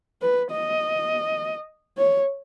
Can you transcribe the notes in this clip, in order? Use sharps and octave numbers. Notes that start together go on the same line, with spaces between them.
B4
D#5
C#5